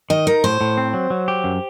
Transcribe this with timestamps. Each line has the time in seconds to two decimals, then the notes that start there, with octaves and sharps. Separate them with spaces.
0.10 D#3 D#5
0.27 D#4 A#4
0.44 A2 C5
0.61 A2
0.77 C4
0.94 F#3
1.10 F#3
1.28 G4
1.44 F#2